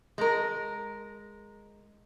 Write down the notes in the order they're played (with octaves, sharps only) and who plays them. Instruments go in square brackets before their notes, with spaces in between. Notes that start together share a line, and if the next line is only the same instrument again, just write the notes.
[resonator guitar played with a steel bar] G#3 A#4